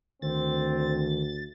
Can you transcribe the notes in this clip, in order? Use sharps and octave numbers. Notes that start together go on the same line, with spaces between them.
D2 D#3 C4 A6